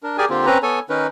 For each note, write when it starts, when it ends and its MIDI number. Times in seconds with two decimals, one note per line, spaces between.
0.03 0.17 62
0.03 0.17 70
0.18 0.25 67
0.18 0.25 68
0.18 0.25 70
0.18 0.25 74
0.18 0.25 80
0.30 0.46 50
0.30 0.46 58
0.30 0.46 60
0.30 0.46 65
0.30 0.46 67
0.46 0.58 60
0.46 0.58 61
0.46 0.58 71
0.46 0.58 82
0.63 0.79 59
0.63 0.79 69
0.63 0.79 73
0.63 0.79 80
0.90 1.07 51
0.90 1.07 61
0.90 1.07 63
0.90 1.07 70
0.90 1.07 71